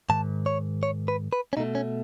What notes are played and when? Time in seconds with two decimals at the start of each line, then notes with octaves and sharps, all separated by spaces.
0.10 G#2 D#3 A5
0.46 C#5
0.83 C#5
1.08 B4
1.33 B4
1.53 C#4
1.57 B2 A3 D#4
1.75 C#4